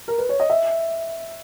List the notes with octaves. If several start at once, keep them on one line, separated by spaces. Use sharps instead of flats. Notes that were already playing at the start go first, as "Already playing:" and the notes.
A#4
B4
C#5
D#5
E5